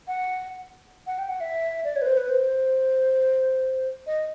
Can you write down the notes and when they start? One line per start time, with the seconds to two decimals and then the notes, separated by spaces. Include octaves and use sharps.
0.08 F#5
1.07 F#5
1.18 G5
1.29 F#5
1.40 E5
1.84 D5
1.96 C#5
2.02 B4
2.07 C5
2.17 B4
2.29 C5
4.07 D#5